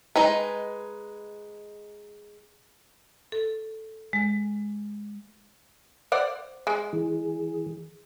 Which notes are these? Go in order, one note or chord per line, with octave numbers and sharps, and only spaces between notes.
G#3 D#4 B4
A4
G#3
C5 D5 F#5
G#3
E3 G#4